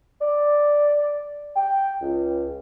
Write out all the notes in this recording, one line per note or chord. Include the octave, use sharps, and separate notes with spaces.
D5
G5
C#2